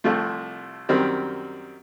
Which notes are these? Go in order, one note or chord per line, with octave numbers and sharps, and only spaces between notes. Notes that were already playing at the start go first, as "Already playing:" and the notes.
C2 C3 F3 A3
F#2 D#3 G3 C4